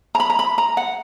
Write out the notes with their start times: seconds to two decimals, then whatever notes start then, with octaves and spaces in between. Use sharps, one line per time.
0.15 A#5
0.20 B5
0.30 A#5
0.39 B5
0.58 A#5
0.77 F#5